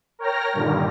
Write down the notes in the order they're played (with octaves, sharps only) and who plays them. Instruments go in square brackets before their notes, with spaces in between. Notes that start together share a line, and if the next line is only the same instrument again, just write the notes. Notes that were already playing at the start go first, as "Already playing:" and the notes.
[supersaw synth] A#4 C#5 G5 A#5 F6 A#6
G2 A#2 D3 D#3 G3